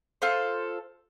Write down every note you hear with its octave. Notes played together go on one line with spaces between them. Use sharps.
F4 A4 C5